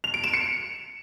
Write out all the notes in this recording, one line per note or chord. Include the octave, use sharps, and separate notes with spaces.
F7
D7
E7
C#7